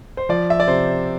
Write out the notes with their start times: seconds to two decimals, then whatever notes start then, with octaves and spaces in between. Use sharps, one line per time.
0.17 C5
0.29 F3 D5
0.50 E5
0.60 D5
0.68 C3 C5